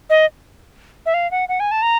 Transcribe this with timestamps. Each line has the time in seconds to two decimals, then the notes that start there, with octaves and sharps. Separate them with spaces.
0.10 D#5
1.06 E5
1.14 F5
1.31 F#5
1.49 F#5
1.60 G#5
1.71 A5
1.82 A#5